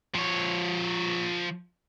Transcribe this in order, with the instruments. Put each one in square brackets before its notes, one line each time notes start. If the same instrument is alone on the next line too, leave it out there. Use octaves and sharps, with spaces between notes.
[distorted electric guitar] F3 C#5